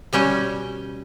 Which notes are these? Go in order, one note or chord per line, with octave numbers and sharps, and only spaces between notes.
B2 G3 C#4 G5